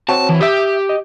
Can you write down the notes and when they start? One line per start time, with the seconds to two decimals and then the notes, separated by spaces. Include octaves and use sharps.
0.09 C4 F#4 C#5 A5
0.29 E3
0.40 G4 E5 D#6
0.89 D#5